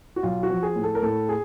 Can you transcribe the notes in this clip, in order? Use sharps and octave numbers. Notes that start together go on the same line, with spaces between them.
F#4
B1 F4
F#4
F3
G#4
A2
A4
A#4
A2 A4
G#4